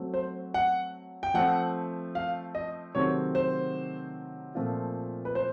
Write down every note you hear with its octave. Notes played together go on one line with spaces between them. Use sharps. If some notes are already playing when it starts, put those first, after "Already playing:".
Already playing: F#3 A3 C4
C5
F#5
G5
F3 A3 C4 F#5
F5
D#5
C3 D#3 F#3 A3 C4 C#5
C5
A#2 F3 A3 C4 F4
B4
C5